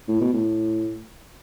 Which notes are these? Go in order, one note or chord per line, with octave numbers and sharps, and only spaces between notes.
A2
B2
A2